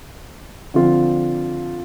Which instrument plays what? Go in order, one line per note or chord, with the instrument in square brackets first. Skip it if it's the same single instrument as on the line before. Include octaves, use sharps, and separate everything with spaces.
[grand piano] D3 F3 C4 F4